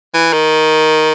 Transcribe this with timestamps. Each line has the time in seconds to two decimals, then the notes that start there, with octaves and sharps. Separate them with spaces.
0.14 E3
0.33 D#3